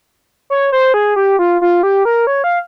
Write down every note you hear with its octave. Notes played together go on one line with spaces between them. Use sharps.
C#5
C5
G#4
G4
F4
F4
G4
A#4
C#5
F5